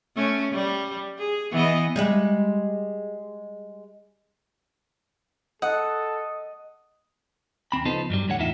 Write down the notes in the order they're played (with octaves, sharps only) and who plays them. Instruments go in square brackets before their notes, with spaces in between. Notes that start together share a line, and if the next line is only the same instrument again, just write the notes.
[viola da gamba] A3 C#4
G3
G#4
E3 B3 D#5
[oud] G3 G#3 F#4
[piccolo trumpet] A4 [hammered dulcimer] D#5 [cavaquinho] F#5
[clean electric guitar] D#2 C4 B5
C#3 F3 B3 D#4 A4 C5
G2 F#3 G3
E2 A2 D3 C#5 F#5
E2 A2 D#4 F4 E5